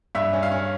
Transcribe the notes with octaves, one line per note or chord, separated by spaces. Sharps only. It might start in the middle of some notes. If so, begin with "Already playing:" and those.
G2 E5
C#4
F5
C#4